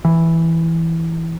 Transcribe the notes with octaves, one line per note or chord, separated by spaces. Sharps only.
E3